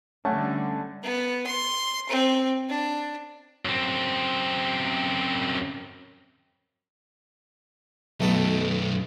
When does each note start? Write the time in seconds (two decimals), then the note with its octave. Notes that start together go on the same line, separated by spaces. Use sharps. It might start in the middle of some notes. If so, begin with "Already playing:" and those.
0.25 D3 G3 A3 C#4 F#5 G#5 A5
1.03 B3
1.46 C6
2.09 C4
2.69 D4
3.65 F#2 C4
8.20 B1 F#2 D#3 A3